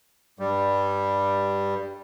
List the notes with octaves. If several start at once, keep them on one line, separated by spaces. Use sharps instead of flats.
G2 G3